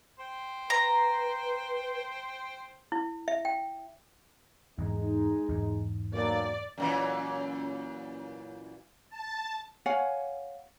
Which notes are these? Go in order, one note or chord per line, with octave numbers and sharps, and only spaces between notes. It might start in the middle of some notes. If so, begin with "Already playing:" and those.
C5 G5
B4 A#5
E4
E5
G5
E2 G#2 G#3 D#4
E2 G#2
B1 A#3 D5
F#2 A#2 E3
A5
C#5 F5 F#5 G#5